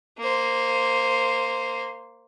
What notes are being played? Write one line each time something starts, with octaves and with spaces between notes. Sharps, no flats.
A#3 C5